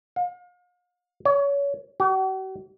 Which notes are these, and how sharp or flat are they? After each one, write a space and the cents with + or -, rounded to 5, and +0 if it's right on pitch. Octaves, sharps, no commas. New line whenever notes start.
F5 +40
C#5 +25
F#4 +45